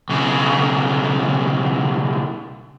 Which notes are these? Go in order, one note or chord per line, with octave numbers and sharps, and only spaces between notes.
B1 C#3